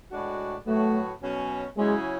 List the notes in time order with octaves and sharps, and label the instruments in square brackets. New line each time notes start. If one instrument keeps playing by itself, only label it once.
[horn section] A2 G#3 D4 F#4
[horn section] A2 F#3 B3 F#4 [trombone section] A3
[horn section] B2 F#3 C#4
[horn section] C#3 F#3 C#4 E4 G#4 [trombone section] G#3